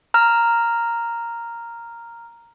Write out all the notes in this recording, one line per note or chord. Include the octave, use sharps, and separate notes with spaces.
A#5 F6